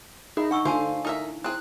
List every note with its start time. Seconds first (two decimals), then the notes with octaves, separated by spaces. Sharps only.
0.37 D#4 E4 G#4
0.51 D4 F#5 C#6 E6
0.65 D3 F4 F#4 C5 F5 G#5 A5
1.05 D#4 E4 A#4 E5
1.44 C4 E4 G#4 F#6